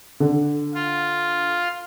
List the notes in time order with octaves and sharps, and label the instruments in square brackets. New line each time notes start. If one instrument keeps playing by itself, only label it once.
[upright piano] D3
[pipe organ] F4